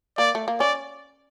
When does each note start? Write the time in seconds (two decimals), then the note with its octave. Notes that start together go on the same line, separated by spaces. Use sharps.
0.18 A#3 D5
0.35 A3
0.48 A#3
0.60 C#4 D5